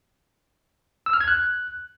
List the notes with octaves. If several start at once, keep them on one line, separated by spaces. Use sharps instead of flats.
E6
F6
G#6
F#6